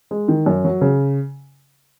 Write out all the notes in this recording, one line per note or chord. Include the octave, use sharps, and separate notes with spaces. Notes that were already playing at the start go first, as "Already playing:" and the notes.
G#3
D#3
F#2
F#3
C#3